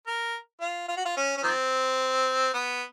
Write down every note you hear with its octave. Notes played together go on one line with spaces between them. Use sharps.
A#4
F4
F4
F#4
F4
C#4
C#4
D#3 F3 C4
B3